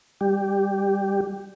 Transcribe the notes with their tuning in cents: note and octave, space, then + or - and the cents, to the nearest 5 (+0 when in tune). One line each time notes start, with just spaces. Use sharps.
G3 +15 G4 +0